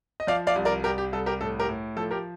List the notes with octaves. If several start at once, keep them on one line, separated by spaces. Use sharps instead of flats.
D#5
F3 D5 F5
D5 F5
C2
A#4 D5
C2 G4 A#4
G4
C2 A4
G4 A#4
A2 A4
G4 A#4
A2
F3 A4
G4 A#4